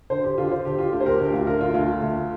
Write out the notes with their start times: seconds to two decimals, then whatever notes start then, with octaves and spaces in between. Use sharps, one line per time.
0.10 D3 C5
0.24 G4
0.38 D3 F4
0.51 C5
0.65 D3 G4
0.79 F4
0.92 D2 G4
1.00 C5
1.06 A#4
1.19 D2 G4
1.33 F4
1.47 D3 A#4
1.61 F4
1.74 D2 F4
2.02 D2